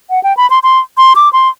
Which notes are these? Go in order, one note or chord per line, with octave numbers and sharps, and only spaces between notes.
F#5
G5
B5
C6
C6
C6
D6
C6